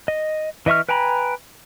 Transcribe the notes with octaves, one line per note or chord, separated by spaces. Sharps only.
D#5
E3 D#5 E5 C#6 F6
B4 G5 G#5 A#5 B5